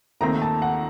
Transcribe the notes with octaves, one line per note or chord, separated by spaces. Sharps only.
D#2 D#3 A3 C4 A#5
A5
F#5